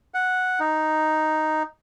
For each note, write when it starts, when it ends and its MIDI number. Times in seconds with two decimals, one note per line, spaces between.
0.14 0.60 78
0.60 1.63 63